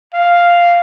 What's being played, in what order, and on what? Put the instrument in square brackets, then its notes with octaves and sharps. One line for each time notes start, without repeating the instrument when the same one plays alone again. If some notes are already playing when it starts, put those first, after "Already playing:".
[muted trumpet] F5